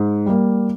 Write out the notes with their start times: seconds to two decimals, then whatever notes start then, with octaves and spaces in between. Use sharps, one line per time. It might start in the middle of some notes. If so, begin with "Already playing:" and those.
Already playing: G#2
0.26 G3 A#3